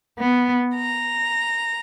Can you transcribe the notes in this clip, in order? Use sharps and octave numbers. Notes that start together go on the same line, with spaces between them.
B3
A#5